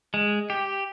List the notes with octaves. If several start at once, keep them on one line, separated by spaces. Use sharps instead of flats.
G#3
G4